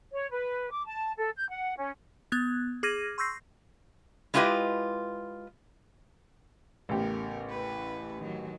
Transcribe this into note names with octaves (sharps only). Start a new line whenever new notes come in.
C#5
B4
D6
A5
A4
G6
F#5
C#4
B3 F#6 G#6
G#4 D6 F6 G#6 A#6 D#7
C6 C#6 E6 G6 A#6 C7
G#3 E4 F4 G4 B4 D#5
A1 C#3 A3 B3 G4 A#4
E4 B4
D#3 F#3